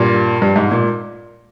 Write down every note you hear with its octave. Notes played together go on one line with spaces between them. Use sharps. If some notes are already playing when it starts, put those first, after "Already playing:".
Already playing: G2 A#2
G2
G#2
A#2